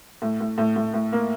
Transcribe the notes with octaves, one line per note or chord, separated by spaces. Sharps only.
A2
A2
A2
A2
A2
A#3